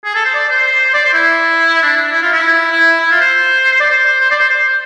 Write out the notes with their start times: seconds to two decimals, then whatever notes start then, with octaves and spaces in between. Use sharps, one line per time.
0.05 G#4
0.15 A4
0.25 C5
0.35 D5
0.49 C5
0.94 D5
1.05 C5
1.14 E4
1.83 D4
1.97 D4
2.12 E4
2.22 F4
2.32 E4
2.72 E4
3.01 E4
3.11 F4
3.20 C5
3.80 D5
3.90 C5
4.20 C5
4.31 D5
4.39 C5
4.50 C5